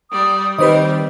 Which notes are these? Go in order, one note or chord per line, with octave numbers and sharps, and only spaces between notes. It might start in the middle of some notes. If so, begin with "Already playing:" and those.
G3 D5 D#6
D#3 G3 C4 G4 B4 C5 D#5